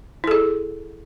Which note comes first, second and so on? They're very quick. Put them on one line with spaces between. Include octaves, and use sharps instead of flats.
E4 A4 G#4